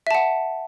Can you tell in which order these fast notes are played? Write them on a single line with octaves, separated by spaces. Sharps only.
E5 A5 F#5